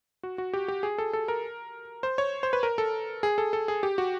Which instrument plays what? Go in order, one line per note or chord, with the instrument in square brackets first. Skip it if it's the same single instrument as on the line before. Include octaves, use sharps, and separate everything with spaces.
[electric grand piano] F#4
F#4
G4
G4
G#4
A4
A4
A#4
C5
C#5
C5
B4
A#4
A4
G#4
A4
A4
G#4
G4
F#4